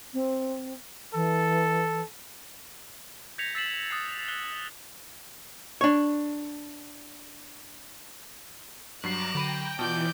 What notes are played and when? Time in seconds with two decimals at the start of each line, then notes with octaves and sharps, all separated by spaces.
0.14 C4
1.14 E3 A4
3.38 G6 G#6 A#6 B6 C#7 F7
3.55 E6 A6 B6 C7 E7 F#7
3.90 D#6 F#6 G#6 A6 C7
4.28 F#6 C7 G7
5.81 D4 C#5
9.04 G2 F#3 A#5 D6 F#6 A#6 C7 E7
9.35 D3 F#3 G5 B5 D#7
9.79 B2 E3 F4 D5 A5 G6